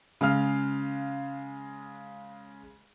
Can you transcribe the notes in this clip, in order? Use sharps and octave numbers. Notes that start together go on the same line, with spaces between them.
C#3 G#3 F5 F6